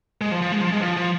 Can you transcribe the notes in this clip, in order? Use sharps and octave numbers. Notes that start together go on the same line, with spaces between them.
G#3
F3
F3
G#3
F3
G#3
F3
F3